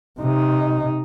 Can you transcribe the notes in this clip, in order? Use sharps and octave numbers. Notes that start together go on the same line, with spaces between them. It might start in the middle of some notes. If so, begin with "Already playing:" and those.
C3 D#4